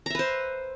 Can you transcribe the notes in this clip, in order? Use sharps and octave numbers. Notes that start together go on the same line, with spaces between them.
B4 C5 E5 A#5